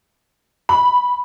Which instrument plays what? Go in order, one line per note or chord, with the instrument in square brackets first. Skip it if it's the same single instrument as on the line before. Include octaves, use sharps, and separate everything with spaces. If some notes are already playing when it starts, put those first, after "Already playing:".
[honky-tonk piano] B5